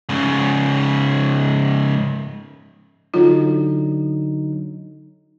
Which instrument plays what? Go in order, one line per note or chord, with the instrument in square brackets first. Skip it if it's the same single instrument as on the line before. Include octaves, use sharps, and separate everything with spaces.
[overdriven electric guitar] G#2 C#3
[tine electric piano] D3 F#3 D#4 [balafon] F4